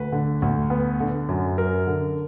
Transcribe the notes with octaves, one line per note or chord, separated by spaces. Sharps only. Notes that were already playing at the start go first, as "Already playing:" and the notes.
Already playing: D2 B4
D3
D2
B3
D3
F#2
F#2 A#4
D3